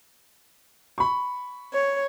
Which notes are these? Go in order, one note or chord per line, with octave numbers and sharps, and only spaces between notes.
B5 C#6
C#5